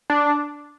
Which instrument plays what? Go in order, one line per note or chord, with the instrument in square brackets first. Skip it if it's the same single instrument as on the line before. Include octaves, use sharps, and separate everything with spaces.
[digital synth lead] D4